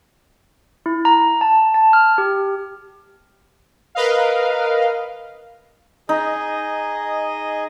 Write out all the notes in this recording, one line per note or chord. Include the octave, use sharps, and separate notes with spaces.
E4
A#5
A5
A5
F6
G4
A#4 B4 D#5 F5
D#4 G#4 D#5